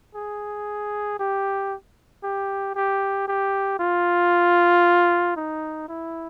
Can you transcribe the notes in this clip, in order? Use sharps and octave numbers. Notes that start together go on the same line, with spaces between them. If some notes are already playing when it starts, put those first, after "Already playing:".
G#4
G4
G4
G4
G4
F4
D#4
E4